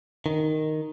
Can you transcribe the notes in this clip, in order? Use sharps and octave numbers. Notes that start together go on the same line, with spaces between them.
D#3